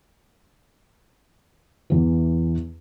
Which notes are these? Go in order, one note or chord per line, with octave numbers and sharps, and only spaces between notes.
E2 E3